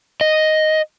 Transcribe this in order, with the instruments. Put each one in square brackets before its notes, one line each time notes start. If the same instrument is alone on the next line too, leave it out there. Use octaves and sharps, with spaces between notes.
[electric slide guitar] D#5